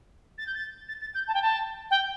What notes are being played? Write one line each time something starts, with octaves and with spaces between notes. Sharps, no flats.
A6
G6
A6
A6
A6
G6
A5
G5
A5
G5